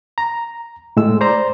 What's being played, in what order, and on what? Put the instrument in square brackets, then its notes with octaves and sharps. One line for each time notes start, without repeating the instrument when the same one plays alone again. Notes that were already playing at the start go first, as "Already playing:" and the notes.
[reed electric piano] A#5
A2 G#3 E6
C5 D5 A#5